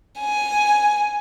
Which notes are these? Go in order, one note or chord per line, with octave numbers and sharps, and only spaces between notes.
G#5